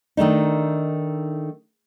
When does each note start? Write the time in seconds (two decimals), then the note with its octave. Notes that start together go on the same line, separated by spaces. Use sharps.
0.17 D#3 A3 D4 D#4